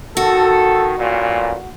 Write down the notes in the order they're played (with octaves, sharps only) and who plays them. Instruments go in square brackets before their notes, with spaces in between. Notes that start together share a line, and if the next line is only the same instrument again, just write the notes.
[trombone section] D#3 A4 [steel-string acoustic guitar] F#4
[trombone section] A1 A#2